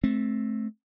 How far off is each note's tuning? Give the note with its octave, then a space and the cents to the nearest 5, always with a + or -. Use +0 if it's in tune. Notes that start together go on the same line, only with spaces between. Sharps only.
A3 -20 C4 +10